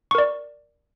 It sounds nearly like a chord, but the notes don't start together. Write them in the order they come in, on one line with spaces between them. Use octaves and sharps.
C#6 A#4 D5